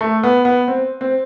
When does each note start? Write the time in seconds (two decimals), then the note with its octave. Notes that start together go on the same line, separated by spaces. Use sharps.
0.01 A3
0.23 B3
0.45 B3
0.68 C4
1.01 C4